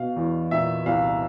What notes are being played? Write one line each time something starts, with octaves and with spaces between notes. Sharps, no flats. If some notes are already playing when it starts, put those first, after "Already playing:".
Already playing: B2 F5
E2
A#2 E5
C2 F5